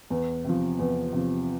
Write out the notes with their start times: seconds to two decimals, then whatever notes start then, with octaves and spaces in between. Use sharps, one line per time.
0.10 E2
0.44 C3 F3
0.79 E2
1.13 C3 F3